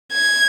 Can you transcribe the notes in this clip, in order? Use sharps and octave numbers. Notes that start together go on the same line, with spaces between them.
G#6